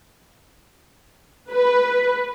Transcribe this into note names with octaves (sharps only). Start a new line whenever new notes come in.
B4